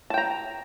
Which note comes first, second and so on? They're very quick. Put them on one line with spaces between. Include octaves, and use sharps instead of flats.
A5 G5 A#5